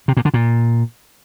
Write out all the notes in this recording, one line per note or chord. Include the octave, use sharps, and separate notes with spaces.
C3
A#2
D3
A#2